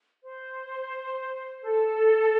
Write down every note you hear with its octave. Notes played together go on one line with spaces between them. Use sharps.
C5
A4